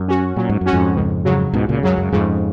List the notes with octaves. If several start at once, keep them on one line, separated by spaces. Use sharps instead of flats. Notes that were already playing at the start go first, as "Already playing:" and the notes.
Already playing: F#2 F#3
C#4 F#4
A#2 F#3
G#2
F#2
C#4 F#4
F2 G#2
C#2
C#3 F#3
C#2 G#2 B2
A#2 C#3
F#2 C#3 F#3
F#2
F2 G#2 C#3